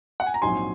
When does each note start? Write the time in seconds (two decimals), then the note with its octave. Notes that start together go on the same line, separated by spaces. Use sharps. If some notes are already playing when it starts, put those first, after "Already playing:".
0.20 F#5
0.26 G#5
0.34 A#5
0.41 A#1 G#2 F#3 C4 G#5 C6